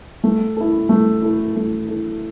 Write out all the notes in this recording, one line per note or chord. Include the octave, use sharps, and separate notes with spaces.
A3
E4 A4
A3
E4 A4
A3
E4 A4